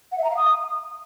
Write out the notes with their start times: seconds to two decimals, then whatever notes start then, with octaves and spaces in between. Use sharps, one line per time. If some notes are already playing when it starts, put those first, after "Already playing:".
0.12 F#5
0.18 E5
0.24 A#5
0.30 F5
0.36 D#6